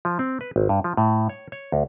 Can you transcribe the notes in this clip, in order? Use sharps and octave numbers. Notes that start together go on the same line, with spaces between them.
F3
C4
B4
G#1
G2
F3
A2
C#5
C#5
D2